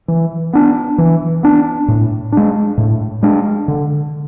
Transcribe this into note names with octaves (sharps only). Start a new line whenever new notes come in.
E3
B3 D4
E3
B3 D4
A2
G#3 D4
A2
G#3 D4
D3